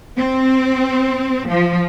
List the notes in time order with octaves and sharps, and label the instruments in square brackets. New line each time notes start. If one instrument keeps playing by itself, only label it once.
[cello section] C4
F3